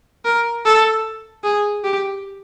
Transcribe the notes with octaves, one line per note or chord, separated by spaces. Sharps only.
A#4
A4
G#4
G4